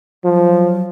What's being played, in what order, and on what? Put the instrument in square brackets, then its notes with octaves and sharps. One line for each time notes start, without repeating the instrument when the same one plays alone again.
[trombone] F3 [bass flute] F#3